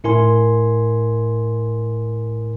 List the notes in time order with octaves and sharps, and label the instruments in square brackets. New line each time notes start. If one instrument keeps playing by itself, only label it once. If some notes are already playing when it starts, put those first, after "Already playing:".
[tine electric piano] A2 E4 A#4 G#5 C6